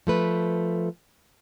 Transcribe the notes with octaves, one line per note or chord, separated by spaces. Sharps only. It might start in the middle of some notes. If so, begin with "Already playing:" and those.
F3 A3 B4